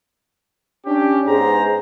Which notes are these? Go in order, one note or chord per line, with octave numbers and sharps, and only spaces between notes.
C#4 D4 G4
G#2 G#3 B3 G#4 C5 A#5